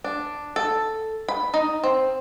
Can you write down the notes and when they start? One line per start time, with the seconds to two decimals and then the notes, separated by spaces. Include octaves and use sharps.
0.04 D4
0.56 A4
1.29 B5
1.54 D#4
1.83 C4